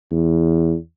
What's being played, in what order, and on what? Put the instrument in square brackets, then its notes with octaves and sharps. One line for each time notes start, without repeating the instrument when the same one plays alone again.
[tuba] E2